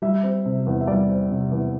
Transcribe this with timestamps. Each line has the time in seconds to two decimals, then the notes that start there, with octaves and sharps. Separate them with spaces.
0.02 G3 E5
0.23 C4
0.45 C3
0.66 E2
0.81 E5
0.87 G3 D5
1.09 C4
1.31 C3
1.51 E2